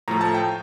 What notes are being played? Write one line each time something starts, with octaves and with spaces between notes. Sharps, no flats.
A2 F3 A3 A#5
A5
G5